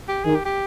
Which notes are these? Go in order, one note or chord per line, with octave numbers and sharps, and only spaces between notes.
G4
D#3 G#4
G4
G4